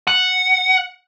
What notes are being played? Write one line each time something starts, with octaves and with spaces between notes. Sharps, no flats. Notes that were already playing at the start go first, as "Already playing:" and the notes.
F#5